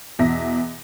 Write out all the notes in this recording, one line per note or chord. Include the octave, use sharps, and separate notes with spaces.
E2 B2 E5 A#6